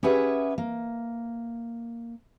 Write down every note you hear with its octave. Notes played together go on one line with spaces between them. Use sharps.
C#4 G4 G#4 B4 E5 F#5
A#3